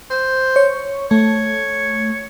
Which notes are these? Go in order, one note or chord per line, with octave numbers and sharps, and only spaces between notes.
C5
C#5
A3 C#5